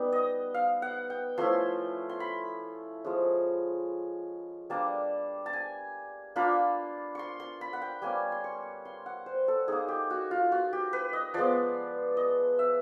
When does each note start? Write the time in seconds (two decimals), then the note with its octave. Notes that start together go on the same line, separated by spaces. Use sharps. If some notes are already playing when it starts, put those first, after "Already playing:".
Already playing: G3 B3 D#4
0.12 D#5
0.54 F5
0.82 F#5
1.10 G5
1.38 F3 A3 C#4 E4 C6
2.09 C6
2.20 B5
3.04 F3 G#3 C#4
4.70 G3 A#3 D4 A5
5.46 A5
5.53 G#5
6.36 A#3 D4 F4 B5
7.15 C6 C#6
7.40 C6
7.61 B5
7.73 F#5
7.82 G5
8.02 G3 A#3 C#4 G#5
8.32 C6
8.44 C#6
8.85 C6
9.06 F#5
9.26 C5
9.48 A4
9.68 A#3 D#4 G#4
9.88 G4
10.10 F#4
10.31 F4
10.52 F#4
10.73 G4
10.93 B4
11.13 D#5
11.34 F3 G#3 B3 D5
12.17 D#5
12.59 E5